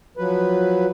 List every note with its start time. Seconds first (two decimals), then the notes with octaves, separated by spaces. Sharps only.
0.17 F3 F#3 B4